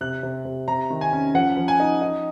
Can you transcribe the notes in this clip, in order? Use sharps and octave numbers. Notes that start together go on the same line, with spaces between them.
C3 F#6
C3
C3
C3 A#5
D#3
G#5
C#4
F3 F#5
F3
G#5
D#4
D#4